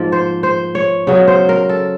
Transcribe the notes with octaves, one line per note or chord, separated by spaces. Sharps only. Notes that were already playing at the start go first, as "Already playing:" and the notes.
Already playing: G#2 F3 A#3
C5
C5
C#5
C#3 F#3 B3
C5
A#4
A4